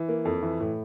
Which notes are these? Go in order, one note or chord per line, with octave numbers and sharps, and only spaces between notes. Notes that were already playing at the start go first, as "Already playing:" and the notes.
Already playing: E3
A#3
F2
E3
A2